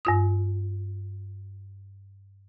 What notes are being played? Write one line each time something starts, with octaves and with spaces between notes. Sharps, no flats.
G2 F4 D#6